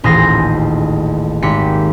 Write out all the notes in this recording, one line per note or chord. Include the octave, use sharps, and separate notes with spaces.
D#1 A1 G#4 A4 C5 A#6
G#1 G4 B6 C#7